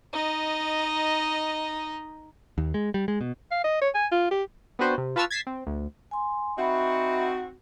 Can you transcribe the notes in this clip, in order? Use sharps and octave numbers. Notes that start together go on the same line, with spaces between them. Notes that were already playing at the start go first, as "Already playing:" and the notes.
D#4 D#5
D#2
G#3
G3
G#3
B2
F5
D#5
C#5
G#5
F4
G4
B3 C4 D4 F#4 B4 C5
C3
F4 B4 A5 C#6 E6 F6
G#6 A6 B6 C7 E7
C4
D2
G#5 C6
C4 D#4 F#4 E5 B5